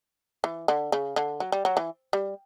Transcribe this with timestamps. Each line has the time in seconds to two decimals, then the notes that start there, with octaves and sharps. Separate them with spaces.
0.44 E3
0.68 D3
0.92 C#3
1.16 D3
1.40 F#3
1.52 G3
1.65 F#3
1.77 E3
2.13 G3